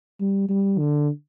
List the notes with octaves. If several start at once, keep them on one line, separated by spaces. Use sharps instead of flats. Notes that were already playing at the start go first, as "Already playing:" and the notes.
G3
G3
D3